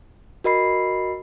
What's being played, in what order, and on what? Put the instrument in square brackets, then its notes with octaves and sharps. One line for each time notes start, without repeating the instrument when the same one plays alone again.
[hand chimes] F#4 A#4 D#5 B5 C7